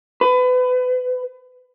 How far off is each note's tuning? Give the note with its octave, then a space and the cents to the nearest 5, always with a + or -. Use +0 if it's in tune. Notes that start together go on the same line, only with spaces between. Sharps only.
B4 +30